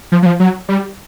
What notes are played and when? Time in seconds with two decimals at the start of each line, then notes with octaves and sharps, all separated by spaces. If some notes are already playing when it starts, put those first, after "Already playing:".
0.12 F3
0.23 F#3
0.26 F3
0.40 F#3
0.69 G3